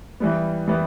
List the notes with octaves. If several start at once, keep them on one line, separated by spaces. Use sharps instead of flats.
E3 G3 B3
E3 G3 B3